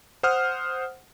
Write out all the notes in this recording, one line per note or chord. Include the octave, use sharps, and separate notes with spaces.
C5 F#5 D#6 F6